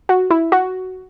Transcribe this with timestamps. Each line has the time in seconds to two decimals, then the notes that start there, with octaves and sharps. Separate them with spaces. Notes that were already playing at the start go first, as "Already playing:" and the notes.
0.09 F#4
0.31 E4
0.52 F#4